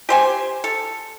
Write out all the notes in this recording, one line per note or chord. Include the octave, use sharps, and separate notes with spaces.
G4 C5 G#5
A4